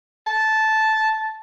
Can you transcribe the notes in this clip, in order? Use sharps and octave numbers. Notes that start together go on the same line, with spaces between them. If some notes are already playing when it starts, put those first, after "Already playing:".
A5